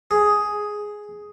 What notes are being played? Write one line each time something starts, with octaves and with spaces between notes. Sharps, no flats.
G#4